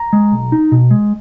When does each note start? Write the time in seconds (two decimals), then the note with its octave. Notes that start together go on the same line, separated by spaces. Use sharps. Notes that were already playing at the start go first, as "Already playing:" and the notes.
Already playing: A#5
0.13 G#3
0.32 B1
0.52 D#4
0.72 B2
0.91 G#3